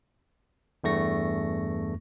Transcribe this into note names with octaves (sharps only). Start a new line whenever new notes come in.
E2 G2 A3 C#6 A#6